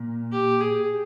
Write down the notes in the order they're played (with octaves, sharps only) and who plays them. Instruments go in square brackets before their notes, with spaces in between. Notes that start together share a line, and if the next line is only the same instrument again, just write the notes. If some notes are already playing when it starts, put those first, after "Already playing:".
Already playing: [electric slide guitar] A#2
[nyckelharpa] G4
G#4